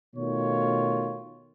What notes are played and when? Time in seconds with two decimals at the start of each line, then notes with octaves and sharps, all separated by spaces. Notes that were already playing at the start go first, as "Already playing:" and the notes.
0.15 B2 D#3 A3 F4 C#5